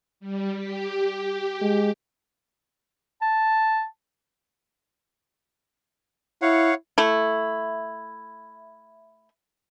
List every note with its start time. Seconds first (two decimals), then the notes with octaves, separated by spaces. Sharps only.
0.20 G3
0.54 G4
1.62 G#3
3.22 A5
6.42 E4 C#5 F5 F#5
6.98 A3 E4